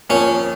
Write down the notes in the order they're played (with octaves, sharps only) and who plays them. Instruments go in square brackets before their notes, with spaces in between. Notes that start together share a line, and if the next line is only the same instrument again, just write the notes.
[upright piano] F2 F3 A#3 [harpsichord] C#4